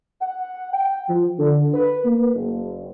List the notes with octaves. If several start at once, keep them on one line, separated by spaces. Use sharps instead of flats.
F#5
G5
F3
D3
B4
A#3
F#1